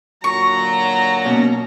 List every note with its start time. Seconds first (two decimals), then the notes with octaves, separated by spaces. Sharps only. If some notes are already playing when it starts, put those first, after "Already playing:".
0.24 A#2 D3 F#3 A#5 C#6
1.25 B2 A#3 C#4